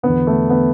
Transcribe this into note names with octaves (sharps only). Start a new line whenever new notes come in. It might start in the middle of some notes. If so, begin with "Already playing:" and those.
E2 D3 B3
A3
D3 B3